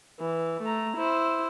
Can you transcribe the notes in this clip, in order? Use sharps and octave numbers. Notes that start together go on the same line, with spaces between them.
E3
A3 A#5
E4 C5